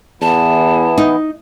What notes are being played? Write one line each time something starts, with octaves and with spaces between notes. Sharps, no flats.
E2 E3 B3 E4 A5
D#4